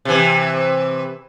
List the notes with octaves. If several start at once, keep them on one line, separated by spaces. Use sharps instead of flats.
C3 E3